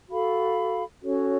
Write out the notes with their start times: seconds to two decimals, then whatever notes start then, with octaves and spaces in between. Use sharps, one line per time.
0.09 F#4 A4 F5 B5
1.02 C#4 F#4 A4 C#5